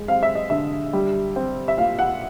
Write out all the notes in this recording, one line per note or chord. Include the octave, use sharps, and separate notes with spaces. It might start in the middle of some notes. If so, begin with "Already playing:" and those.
Already playing: G#3
C4 F5
E5
D#5
D3 E5
G3
C4
E5
A#2 F5
F#5